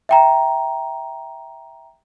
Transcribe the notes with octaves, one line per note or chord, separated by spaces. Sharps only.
E5 G5 A#5